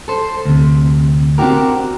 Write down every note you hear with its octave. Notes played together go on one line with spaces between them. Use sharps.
A4 C5
D2 C3
C4 D4 D#4 F#4 G4 A#4